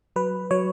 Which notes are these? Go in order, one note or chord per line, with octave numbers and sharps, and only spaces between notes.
F#3 B4
F#3 C#5